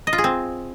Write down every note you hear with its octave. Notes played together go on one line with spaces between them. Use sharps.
D#5
F4
G#4
C4